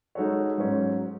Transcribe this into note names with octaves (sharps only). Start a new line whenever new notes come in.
G#3 D#4 F#4 A4 C#5
G#2 F#3 C#4